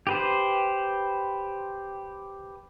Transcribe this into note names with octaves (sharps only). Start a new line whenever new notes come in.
G4 B4 C5